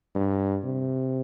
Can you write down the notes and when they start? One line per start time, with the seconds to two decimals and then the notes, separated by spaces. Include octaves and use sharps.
0.15 G2
0.64 C3